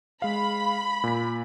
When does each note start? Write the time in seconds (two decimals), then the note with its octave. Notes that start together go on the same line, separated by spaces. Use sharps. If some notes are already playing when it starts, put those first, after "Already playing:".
0.22 G#3 F5 B5
1.04 A#2 B6